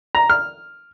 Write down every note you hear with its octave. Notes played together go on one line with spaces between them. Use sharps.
A#5
F6